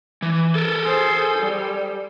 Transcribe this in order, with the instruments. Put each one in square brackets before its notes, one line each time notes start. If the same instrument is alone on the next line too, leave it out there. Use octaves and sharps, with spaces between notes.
[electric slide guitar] E3
A4 A#4
[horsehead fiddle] G#4 C5
G3